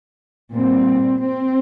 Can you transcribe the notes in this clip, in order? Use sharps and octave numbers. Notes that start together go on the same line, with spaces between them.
A#2 G3 C4
C4